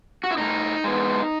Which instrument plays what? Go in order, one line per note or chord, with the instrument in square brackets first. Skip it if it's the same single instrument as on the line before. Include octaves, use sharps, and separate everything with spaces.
[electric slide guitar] F#4
E4
A2 D#4
G#3 B3